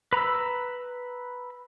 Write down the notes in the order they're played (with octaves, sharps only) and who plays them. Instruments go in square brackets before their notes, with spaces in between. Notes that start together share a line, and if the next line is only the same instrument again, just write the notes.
[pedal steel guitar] B4 A#5 B5 E6